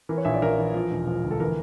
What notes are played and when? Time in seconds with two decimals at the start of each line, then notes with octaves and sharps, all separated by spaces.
0.09 E3 A#4
0.18 C#5
0.25 A#1 E5
0.34 D5
0.42 A#1 A#4
0.58 E3
0.74 F3
0.91 E1
1.07 F3
1.24 D2
1.31 A4
1.40 E3 A#4